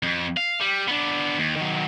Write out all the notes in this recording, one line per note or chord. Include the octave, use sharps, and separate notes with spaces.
F2
F5
G3
B3 D4
D#2
D#3 F#3